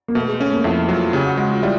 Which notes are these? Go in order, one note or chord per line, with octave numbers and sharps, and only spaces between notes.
A#3
B2 A3
G#3
A3 C#4
A#3
F2 E4
F#3 F4
C#3 G4
F#4
G#3 F#4
F4
G3 E4